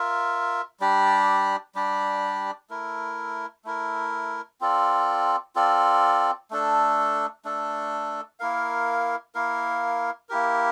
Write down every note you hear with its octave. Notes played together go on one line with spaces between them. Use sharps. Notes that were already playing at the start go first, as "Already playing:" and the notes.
Already playing: F4 A#4 E5
G3 D4 G4 D5
G3 D4 G4 D5
A3 E4 A#4
A3 E4 A#4
C4 F4 A4 D5
C4 F4 A4 D5
A3 D4 A4
A3 D4 A4
A#3 E4 A#4 F5
A#3 E4 A#4 F5
A#3 E4 G4 A#4